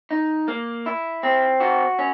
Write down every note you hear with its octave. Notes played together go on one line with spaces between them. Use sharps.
D#4
A#3
E4
C4
F#4
C#4